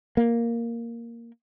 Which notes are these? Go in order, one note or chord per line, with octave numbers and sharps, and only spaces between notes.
A#3